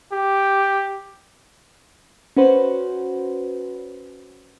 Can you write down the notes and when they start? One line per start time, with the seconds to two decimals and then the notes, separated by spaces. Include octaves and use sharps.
0.12 G4
2.37 C#4 F#4 B4 C5